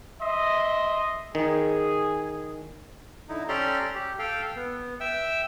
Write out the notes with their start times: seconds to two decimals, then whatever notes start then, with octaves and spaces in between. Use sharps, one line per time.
0.21 D#5 E5 C6
1.35 D#3 G#4
3.29 D3 D#4 E4
3.49 C#4 G4 A4 D5 A#5 C6
3.95 G4
4.19 A4 F5 G5
4.56 B3
5.00 E5 G5 E6